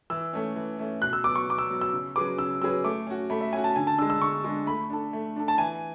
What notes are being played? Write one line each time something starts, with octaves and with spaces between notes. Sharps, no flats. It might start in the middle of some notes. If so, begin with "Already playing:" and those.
E3 E6
A3 C#4
E3
A3 C#4
B2 F#6
E6
F#3 B3 D6
C#6
B2 D6
E6
F#3 B3
E6
C#3
F#3 C#4 G#4 B4 D6
C#3 E6
F#3 C#4 G#4 B4 E6
A3 D6
C#4 F#4
A3 B5
E5
C#4 F#4 G#5
A5
D3 G#5
A5
G#3 D4 E6
E6
D3 C#6
G#3 D4
A3 B5
D4 A4
A3
D4 A4
A5
E3 G#5